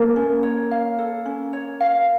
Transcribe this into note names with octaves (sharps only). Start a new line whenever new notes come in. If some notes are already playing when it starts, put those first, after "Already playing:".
Already playing: A#3 A4
C#4
C#5
F5
A4
C#4
C#5
F5